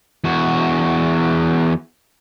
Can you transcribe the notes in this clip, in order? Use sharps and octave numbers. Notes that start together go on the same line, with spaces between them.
E2 F#4